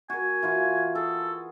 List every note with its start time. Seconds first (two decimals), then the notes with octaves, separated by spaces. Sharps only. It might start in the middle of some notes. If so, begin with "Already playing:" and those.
0.10 F#4 A#4 G#5
0.43 E3 F4 F#4
0.95 G#4 A4